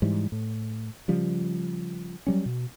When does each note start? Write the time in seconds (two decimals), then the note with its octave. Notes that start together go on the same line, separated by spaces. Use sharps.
0.02 G#2 E3 G3
0.32 A2
1.08 C#3 F3 G3
2.27 F#3 G3 C#4
2.46 B2